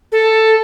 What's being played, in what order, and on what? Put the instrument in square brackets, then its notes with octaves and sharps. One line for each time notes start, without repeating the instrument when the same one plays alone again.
[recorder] A4